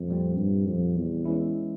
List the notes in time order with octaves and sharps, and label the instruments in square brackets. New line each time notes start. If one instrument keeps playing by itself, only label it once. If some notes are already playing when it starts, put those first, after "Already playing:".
Already playing: [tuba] F2
[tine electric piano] A#2 G3 C4
[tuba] G2
F2
E2
[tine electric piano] E3 G#3 C#4 E4